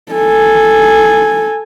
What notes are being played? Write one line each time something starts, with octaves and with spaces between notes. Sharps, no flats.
A4 G#5